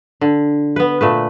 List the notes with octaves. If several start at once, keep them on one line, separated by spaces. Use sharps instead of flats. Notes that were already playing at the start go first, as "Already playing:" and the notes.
D3
B3 B4
A#2 A3 B4